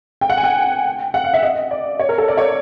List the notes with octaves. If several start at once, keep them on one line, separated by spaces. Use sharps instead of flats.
G5
F#5
G#5
G5
F#5
F5
E5
D#5
D5
C#5
A#4
A4
D5
C#5